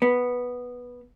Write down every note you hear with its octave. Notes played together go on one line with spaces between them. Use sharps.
B3